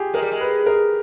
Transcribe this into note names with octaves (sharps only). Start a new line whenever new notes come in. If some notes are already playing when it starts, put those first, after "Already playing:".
Already playing: F4 G4 G#4
G#3 A#4
G3
G#3
B4
A#4